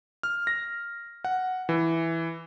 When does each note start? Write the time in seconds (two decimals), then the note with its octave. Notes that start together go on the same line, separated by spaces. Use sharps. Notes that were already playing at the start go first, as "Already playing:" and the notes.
0.23 F6
0.47 A#6
1.24 F#5
1.69 E3